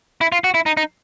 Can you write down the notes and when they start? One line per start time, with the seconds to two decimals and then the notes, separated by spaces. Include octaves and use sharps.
0.21 E4
0.32 F4
0.44 F#4
0.54 E4
0.66 D#4
0.77 D#4